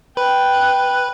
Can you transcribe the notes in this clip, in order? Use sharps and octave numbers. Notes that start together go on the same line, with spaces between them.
B4 G5 F#6